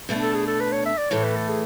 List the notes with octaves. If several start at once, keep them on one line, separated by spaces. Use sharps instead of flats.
B2 A3 D4
A4
G#4
A4
B4
C#5
E5
D5
A2 E3 A3 C#5
B4
A4
G#4